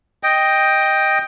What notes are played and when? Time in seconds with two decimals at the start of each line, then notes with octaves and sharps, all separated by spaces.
0.23 D#5 G5